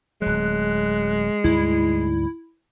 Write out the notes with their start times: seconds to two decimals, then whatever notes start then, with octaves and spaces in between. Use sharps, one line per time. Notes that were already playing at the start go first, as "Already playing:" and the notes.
0.22 D1 F#3 G#3 F#6
1.44 D2 G#2 G3 E4